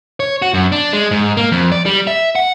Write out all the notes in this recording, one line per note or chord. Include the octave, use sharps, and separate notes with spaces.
C#5
F#4
F#2
D4
G#3
G#2
A#3
F2
D5
G3
E5
F#5